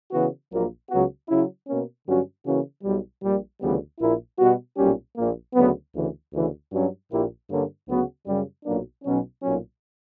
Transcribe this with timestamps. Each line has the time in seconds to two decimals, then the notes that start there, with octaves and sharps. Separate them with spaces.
0.12 C#3 E3 B3 F#4
0.51 A#1 A#2 F#3 A#3
0.90 C#2 C#3 F#3 B3 F#4
1.29 C#3 F#3 C#4 E4
1.67 B2 A#3 C#4
2.06 G2 D3 F#3 C#4 F#4
2.45 C#3 E3 A#3 C#4 F#4
2.83 B1 B2 G3
3.23 A#1 A#2 G3
3.61 D2 C#3 E3 G3 B3
4.00 A#1 A#2 A#3 E4
4.39 B2 G3 B3 F#4
4.77 B1 A#2 G3 C#4 G4
5.16 A#1 A#2 A#3
5.55 D2 C#3 F#3 B3
5.93 D2 C#3 E3
6.33 D2 C#3 E3
6.72 G2 F#3 C#4 F#4
7.10 A#1 A#2 A#3 E4 G4
7.49 G2 D3 A#3 C#4
7.87 D2 C#3 F#3 B3 F#4
8.26 F#2 C#3 G3
8.65 B1 A#2 F#3 A#3 D4
9.04 B1 B2 F#3 C#4
9.43 B1 A#2 F#3 C#4